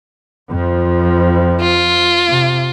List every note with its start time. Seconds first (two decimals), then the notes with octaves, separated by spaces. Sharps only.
0.50 F2 F3
1.61 F4
2.28 C3